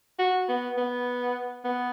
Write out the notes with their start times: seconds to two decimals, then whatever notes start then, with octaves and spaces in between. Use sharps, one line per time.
0.19 F#4
0.48 B3
0.77 B3
1.64 B3